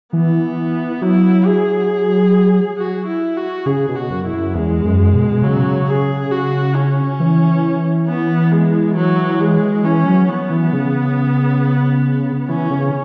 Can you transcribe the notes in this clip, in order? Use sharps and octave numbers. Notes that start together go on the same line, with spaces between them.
E3 B3
F#3 E4
G#4
F#4
E4
F#4
C#3 G#4
B2
F#4
F#2
E4
F#2
E2 G#3
F#2
B2
B2
C#3 F#3
G#4
F#4
C#4
E3
B3
G#3
F#3
G#3
E3 C#4
F#3
B3
E3
C#3
E3 C#4
C#3